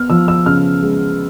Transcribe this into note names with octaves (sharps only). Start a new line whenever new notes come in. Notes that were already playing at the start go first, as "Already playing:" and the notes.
Already playing: B3 F6
F3 E6
E6
C#3 F6
G#3